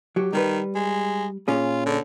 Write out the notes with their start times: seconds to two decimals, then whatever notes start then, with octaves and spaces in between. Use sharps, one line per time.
0.16 F#3 G4
0.33 D#3 G3 B4
0.75 G#3
1.48 A#2 C#4 F4 G#4
1.86 D3